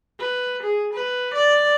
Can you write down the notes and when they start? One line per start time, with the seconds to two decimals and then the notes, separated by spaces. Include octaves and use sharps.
0.19 B4
0.63 G#4
0.93 B4
1.34 D5